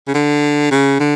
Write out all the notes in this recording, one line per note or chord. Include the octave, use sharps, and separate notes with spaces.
C#3
D3
C#3
D3